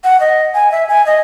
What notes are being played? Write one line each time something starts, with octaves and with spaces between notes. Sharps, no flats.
F#5
D#5
G#5
E5
G#5
D#5